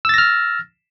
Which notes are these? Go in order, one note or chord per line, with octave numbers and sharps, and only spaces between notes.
E6 F6 A6 A#6